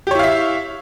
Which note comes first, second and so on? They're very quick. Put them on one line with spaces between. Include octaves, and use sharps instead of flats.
G4 C#5 E4 F5 E5